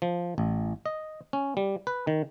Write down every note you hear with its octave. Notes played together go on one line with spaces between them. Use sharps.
F3
A1
D#5
C#4
G3
B4
D#3